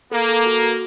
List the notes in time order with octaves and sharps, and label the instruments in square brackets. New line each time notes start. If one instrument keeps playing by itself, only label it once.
[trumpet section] A#3 [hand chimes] A4
[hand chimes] A4
F#4
F#4